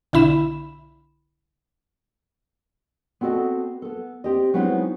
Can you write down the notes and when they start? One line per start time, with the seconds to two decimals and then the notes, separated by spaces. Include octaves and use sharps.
0.13 B1 D3 E4 B5 E7
3.21 B3 C4 F#4 A4 D#5 A5
3.82 B3 A4
4.24 C4 G4 D#5
4.54 F#3 G#3 B3 C4 D#4 E4